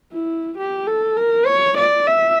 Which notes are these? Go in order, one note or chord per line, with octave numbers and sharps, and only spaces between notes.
E4
G4
A4
A#4
C#5
D5
E5